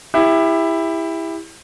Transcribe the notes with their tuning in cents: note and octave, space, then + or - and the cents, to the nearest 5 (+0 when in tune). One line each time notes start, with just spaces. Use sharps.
E4 +0 G4 +30